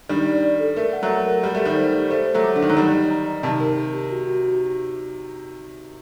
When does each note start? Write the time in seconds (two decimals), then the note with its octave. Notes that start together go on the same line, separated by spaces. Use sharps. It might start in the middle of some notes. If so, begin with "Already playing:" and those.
0.09 D#3 G3 D4
0.26 D5
0.43 D5
0.59 A4
0.76 A3 A#4
0.93 F#5
1.03 F#3 A3
1.10 F#5
1.26 A#4
1.43 G3 G4
1.55 A3
1.60 G4
1.65 D#3 G3
1.76 C5
1.93 G4
2.10 A3 C5
2.27 C5
2.34 F#3 A3
2.43 D6
2.56 D3
2.60 D#3 F#5
2.70 F#3
2.77 D#3 G3 A#5
2.94 D#5
3.11 A#5
3.28 D#5
3.43 C3 D#3 A5
3.60 A#4
3.77 G4
3.94 G4
4.10 F#4
4.27 F#4
4.44 F#4